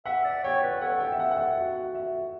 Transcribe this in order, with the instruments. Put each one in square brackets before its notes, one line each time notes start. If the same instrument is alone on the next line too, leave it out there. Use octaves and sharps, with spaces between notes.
[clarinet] E5 [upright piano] F#5
[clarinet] D5
[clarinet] C#5 [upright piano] G5
[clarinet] B4
[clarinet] A4 [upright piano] F#5
[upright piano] G5
E5
F#5
F#5
E5
[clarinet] F#4 [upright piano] E5
[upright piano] E5